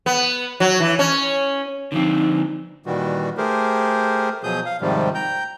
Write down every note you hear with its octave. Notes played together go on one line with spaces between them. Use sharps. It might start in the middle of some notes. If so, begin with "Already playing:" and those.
B3
F#3
E3
C#4
D3 F3 C4 D#4
A#2 D#3 E3 G3 F#4
A3 G4 G#4 A#4 C5
B2 F3 F#3 G#4 D#6 G6
F5
G#2 C3 D#3 F3 G3
G5 A#5 G6